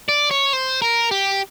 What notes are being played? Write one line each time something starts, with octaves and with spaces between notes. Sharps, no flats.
D5
C#5
C5
A#4
G4